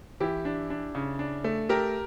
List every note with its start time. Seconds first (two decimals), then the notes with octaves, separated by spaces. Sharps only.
0.20 E3 E4 G4
0.45 D4
0.70 D4
0.95 C#3
1.19 D4
1.44 A3
1.69 A3 G4 A#4